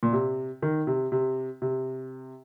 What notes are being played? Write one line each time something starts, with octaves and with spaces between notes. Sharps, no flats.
A#2
C3
D#3
C3
C3
C3